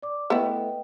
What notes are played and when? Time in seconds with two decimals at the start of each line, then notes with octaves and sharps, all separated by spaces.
0.02 D5 D6
0.30 A3 B3 E4 B4 D#5 G5